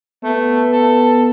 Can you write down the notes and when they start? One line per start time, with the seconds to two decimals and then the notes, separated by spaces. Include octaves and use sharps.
0.24 A3 B3
0.72 A4